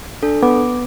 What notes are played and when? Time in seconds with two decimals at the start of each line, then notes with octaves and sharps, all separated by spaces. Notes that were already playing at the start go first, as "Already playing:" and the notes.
0.23 D4 A4
0.43 B3 D6